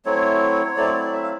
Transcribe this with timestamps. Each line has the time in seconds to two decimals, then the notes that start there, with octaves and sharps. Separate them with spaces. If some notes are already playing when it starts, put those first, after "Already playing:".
0.05 F#3 A3 C4 E4 C#5
0.76 F#3 A3 C4 E4 D5
0.86 C#5
0.94 D5
1.12 E5
1.23 F5